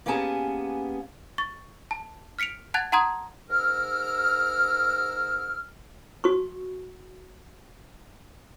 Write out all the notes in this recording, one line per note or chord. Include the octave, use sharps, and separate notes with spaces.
A#3 B3 C#4 G4 G#4 A5
C#6 A6
A5
F6 B6 C#7 D7 F7
F#5 A5 F#6 G#6 A6 F7
F#5 A5 A#5 C6 D#6 G#6
G#2 A#4 E6 F6
F#4 C#6